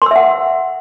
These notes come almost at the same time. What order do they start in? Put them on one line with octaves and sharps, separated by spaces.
C6 E6 E5 F#5